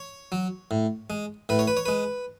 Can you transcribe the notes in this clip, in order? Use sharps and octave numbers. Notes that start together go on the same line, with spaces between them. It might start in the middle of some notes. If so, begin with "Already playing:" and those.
Already playing: C#5
F#3
A2
G#3
A2 B4
C#5
B4
C#5
G#3 B4